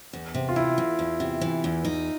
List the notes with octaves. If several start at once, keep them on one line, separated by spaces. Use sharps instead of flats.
E2
C3
F4
E3 E4
E2
E2
C3
E3
E2
D#4